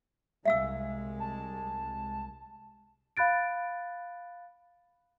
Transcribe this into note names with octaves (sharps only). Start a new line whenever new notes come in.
C2 G#3 E5 F5 E6
A5
F5 B5 F#6 A6 D7